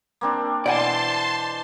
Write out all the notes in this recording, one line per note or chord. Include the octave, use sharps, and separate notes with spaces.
A#3 C4 D4
B2 E3 C5 D5 F#5 G#5 A5 C6